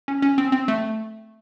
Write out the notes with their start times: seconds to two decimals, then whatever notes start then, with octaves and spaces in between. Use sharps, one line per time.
0.08 C#4
0.22 C#4
0.38 C4
0.52 C4
0.68 A3